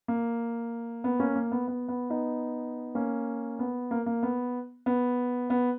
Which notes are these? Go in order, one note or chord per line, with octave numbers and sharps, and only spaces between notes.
A#3
B3
A#3 C#4
A#3
B3
B3
B3
B3 D#4
A#3 C#4
B3
A#3
A#3
B3
B3
B3